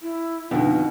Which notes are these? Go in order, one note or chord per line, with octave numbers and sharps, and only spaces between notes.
E4
F2 B2 D3 D#3